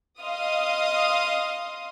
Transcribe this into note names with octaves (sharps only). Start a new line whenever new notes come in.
D#5 F5 C6 D#6